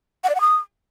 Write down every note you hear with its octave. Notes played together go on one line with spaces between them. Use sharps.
F#5
D5
F#5
D#6